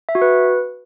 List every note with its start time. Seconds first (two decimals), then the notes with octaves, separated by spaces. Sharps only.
0.09 E5
0.15 F#4
0.22 B4